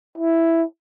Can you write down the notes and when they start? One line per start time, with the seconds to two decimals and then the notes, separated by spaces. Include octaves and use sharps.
0.18 E4